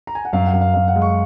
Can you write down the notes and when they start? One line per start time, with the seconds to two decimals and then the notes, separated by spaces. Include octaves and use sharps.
0.07 A#5
0.15 G#5
0.25 F#5
0.33 F#2 F5
0.46 F#5
0.53 F#2
0.61 F5
0.74 F#2 F5
0.88 F#5
0.96 G#3
1.02 C#6